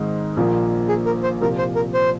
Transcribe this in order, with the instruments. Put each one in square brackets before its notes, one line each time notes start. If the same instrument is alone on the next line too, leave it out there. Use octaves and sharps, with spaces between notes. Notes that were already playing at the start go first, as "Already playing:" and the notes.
Already playing: [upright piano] G#2 D#3 G#3 C4
A#1 A#2 F3 A#3 F4
[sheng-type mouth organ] G#4
A#4
C5
[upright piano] C2 A#2 F3 [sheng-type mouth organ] A#4
[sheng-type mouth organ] C5
A#4
C5